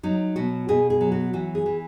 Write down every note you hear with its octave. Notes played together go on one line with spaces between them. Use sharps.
F#3 D#4
B2 F#4
B2 G#4
G#4
F#3
F#4
E3 F#4
G#4
E3